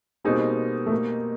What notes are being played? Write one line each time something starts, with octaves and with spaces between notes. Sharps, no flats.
B2 G3 A#3 C4 D#4 G#4
A3
A#3